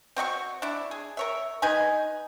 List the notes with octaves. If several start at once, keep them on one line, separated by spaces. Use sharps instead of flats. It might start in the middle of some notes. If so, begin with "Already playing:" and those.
C4 F#4 D#5 C#6
D4 E4
G#4
A#4 C#5 E5
D#4 B4 G#5